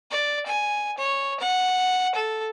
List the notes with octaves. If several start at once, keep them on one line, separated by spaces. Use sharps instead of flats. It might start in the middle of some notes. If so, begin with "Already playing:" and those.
D5
G#5
C#5
F#5
A4